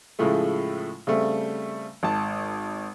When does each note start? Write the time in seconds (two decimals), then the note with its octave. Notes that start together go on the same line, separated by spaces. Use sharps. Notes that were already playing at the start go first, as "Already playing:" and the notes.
0.19 A2 C#3 F3 G#3 A3
1.07 C#3 G3 A3 C4
2.03 G#1 A5